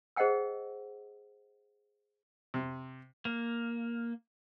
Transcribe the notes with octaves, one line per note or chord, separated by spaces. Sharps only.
G#4 C5 D#5 F#5 G5 E6
C3
A#3